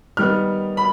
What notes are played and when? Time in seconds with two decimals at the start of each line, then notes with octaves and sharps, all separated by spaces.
0.17 D#3 G3 B3 F6
0.77 B5